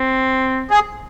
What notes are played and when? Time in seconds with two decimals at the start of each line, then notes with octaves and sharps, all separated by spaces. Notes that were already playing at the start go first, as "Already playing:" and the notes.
Already playing: C4
0.71 G#4